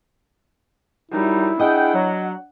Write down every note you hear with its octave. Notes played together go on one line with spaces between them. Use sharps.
F#2 G3 D#4 E4
D4 G#4 D#5 F#5 G5
F#3